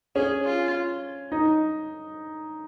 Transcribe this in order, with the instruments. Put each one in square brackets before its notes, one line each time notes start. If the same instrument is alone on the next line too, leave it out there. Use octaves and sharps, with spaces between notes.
[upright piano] C#4 [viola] G#4
[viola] F4
[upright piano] D#4